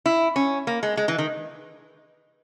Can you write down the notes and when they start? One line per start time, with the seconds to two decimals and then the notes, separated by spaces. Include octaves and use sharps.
0.06 E4
0.36 C#4
0.67 A#3
0.83 G#3
0.97 G#3
1.08 E3
1.18 D#3